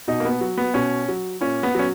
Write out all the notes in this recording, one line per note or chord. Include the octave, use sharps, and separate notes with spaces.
B2 D#4
A#3
B3
F#3
B3
B2 C#4
F#3
A#2 C#4
B3
F#3 C#4